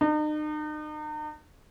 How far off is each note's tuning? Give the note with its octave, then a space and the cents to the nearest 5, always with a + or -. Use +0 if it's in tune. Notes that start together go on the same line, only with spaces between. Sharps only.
D#4 -40